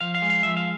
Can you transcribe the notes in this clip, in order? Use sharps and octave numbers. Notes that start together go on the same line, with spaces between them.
F3 F5
F5
G#3
F5
F3 E5
F5